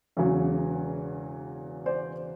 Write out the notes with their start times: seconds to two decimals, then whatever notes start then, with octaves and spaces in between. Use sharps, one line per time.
0.16 E1 E2 C#3 F#3
1.86 C5 D5